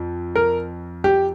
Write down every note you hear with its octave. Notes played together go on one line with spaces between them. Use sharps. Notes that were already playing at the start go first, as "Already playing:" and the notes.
Already playing: F2
A#4
G4